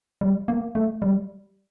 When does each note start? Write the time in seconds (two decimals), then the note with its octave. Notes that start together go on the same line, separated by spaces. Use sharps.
0.21 G3
0.48 A#3
0.75 A3
1.02 G3